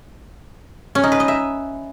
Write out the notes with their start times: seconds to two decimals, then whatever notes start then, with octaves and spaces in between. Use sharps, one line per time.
0.95 C#4
1.03 D#4
1.12 B4
1.20 D#5
1.28 E5